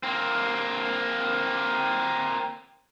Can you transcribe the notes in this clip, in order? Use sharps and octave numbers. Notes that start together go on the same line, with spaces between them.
A#3 C4